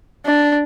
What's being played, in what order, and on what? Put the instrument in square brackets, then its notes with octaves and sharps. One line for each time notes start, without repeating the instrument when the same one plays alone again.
[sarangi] D4